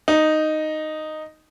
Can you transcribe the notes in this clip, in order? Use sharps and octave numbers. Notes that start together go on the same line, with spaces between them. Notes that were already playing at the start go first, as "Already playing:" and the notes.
D#4